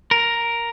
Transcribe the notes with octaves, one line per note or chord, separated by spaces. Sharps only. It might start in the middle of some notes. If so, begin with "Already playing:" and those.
A#4